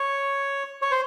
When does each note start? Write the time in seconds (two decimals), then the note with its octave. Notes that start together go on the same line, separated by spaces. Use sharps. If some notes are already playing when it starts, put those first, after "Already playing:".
Already playing: C#5
0.82 C#5
0.91 C5